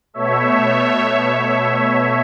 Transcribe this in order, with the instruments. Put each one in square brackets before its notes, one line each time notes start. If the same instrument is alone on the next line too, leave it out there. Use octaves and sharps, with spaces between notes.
[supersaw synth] B2 A3 C#5 E5